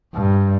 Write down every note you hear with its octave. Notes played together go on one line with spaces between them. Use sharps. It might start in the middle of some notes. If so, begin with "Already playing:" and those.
G2